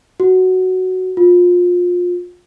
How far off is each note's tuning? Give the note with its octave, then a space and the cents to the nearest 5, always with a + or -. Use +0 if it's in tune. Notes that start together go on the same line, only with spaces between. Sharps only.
F#4 +5
F4 +25